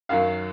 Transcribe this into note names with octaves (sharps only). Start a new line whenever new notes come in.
F#2 D#3 F#3 F5